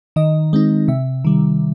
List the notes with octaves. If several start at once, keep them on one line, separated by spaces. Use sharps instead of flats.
D#3 D#5
G#3 C4 D#4
C3 E5
D#3 G3